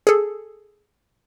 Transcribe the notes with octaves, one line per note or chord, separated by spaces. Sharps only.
G#4 A4